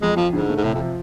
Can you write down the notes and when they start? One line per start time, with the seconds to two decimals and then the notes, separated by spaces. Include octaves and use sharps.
0.01 F2 G#3
0.17 F2 F3
0.33 G#2 D3
0.49 A3
0.56 G#2
0.64 A2 C3
0.74 F2
0.79 F3